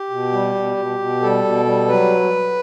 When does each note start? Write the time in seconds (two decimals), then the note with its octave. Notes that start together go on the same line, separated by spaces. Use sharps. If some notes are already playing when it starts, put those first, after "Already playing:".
Already playing: G4
0.10 B2
0.32 G3
0.55 B2
0.77 B2
0.99 B2
1.21 G3 A4
1.44 B2
1.66 G3
1.88 F#3 B4